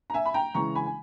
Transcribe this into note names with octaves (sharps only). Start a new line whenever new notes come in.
A#5
E5 G#5
B5
G5 A#5
C#3 E3 G#3 A#5 C#6
G#5 B5
G#5